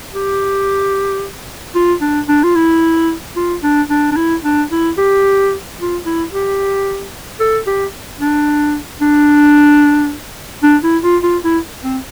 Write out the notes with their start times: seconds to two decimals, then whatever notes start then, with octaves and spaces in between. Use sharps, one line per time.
0.13 G4
1.75 F4
2.01 D4
2.28 D4
2.44 F4
2.55 E4
3.36 F4
3.63 D4
3.90 D4
4.12 D4
4.17 E4
4.44 D4
4.71 E4
4.98 G4
5.79 F4
6.05 E4
6.32 G4
7.40 A4
7.67 G4
8.21 D4
9.01 D4
10.63 D4
10.83 E4
11.03 F4
11.23 F4
11.44 E4
11.84 C4